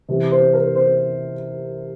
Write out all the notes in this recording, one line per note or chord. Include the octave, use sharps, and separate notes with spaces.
C3 E3
C5
A#4
C5